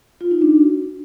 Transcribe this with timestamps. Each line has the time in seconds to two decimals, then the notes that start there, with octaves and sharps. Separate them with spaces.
0.21 F4
0.31 D#4
0.42 D4
0.52 F#4